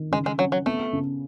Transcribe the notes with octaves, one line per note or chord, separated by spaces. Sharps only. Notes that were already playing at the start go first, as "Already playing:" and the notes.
Already playing: D#3
C#3 G#3
G#3
F#3 C#4
F#3
A3 B3
C#3